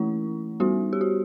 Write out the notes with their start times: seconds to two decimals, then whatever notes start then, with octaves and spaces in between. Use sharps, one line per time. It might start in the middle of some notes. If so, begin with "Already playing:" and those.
Already playing: E3 A3 C#4 E4
0.60 G3 B3 D#4 F#4
0.93 G4
1.01 F#4